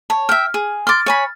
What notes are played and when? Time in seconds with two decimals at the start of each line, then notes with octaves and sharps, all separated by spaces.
0.10 C#5 A5
0.29 E5 G5 F6
0.54 G#4
0.87 C6 D6 F6 A6
1.06 C#5 G#5 B5